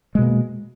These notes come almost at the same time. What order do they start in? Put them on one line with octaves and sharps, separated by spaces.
G#3 B2 A#3